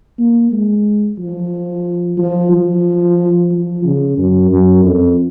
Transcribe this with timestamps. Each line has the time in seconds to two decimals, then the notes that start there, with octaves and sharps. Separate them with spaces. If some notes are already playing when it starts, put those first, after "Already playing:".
0.18 A#3
0.52 G#3
1.18 F3
2.18 F3
2.52 F3
3.51 F3
3.85 C#3
4.18 F#2
4.51 F#2
4.84 F2